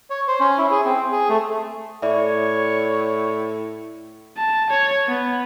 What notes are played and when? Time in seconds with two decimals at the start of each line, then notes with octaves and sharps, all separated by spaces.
0.10 C#5
0.28 C5
0.40 C#4
0.58 E4
0.71 G#4
0.85 C4
1.12 G#4
1.29 A3
2.02 A2 C#5 D5 E5
4.37 A5
4.70 C#5
5.08 B3